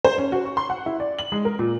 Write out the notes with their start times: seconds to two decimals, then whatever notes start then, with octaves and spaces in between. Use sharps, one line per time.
0.05 C5
0.18 C#4
0.32 F#4
0.45 C#6
0.57 C6
0.70 F#5
0.86 E4
1.00 D5
1.19 F#7
1.32 G#3
1.45 A#4
1.59 A#2